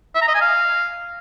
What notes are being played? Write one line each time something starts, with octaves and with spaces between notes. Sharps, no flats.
E5
A#5
D#5
G#5
F5